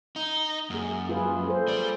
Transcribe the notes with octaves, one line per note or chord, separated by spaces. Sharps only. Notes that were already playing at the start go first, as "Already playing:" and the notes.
D#4
F#2 A#3 G#4
F4 G#4 B4
A4 C5
G3 D5